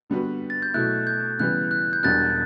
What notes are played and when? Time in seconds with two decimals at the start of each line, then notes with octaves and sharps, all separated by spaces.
0.10 D3 G3 B3 F#4 B4
0.50 A6
0.62 G6
0.74 B2 F#3 A3 E4 F#6
1.07 G6
1.39 C#3 E3 G3 B3 F#6
1.71 F#6
1.93 G6
2.03 E1 E2 B2 G3 D4 F#6 A6